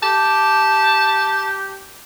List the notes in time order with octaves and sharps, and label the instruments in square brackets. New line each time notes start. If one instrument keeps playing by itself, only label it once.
[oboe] G4 [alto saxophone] A5